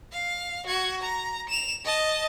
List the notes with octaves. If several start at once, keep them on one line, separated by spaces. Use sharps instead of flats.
F5
F#4 G#6
A#5
E7 F7
D#5 A5